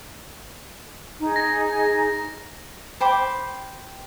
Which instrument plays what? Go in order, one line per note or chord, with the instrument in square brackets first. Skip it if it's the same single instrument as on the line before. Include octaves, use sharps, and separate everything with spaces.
[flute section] D#4 G#4
[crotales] A#6
[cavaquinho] C5 G5 B5 D6